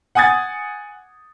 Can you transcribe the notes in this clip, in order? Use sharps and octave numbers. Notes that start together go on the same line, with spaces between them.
F#5 G#5 D#6 G#6 A6